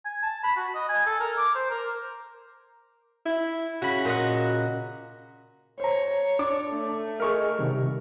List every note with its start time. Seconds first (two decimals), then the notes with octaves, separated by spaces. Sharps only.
0.05 G#5
0.23 A5
0.44 B5
0.57 F#4
0.75 D#5
0.89 G#5
1.06 A4
1.20 A#4
1.37 D6
1.55 C5
1.70 A#4
3.26 E4
3.82 C#3 F#4 B5
4.05 A#2 D#5 F#5
5.80 C5 C#5 A#5
6.39 D4 A5 D6
6.71 A3
7.20 G#4 A#4 D#5 C#6 F6
7.59 C3 D#3 G3